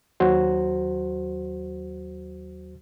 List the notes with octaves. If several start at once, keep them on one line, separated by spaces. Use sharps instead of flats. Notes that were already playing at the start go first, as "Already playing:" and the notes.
D#2 F#3 F#4 C5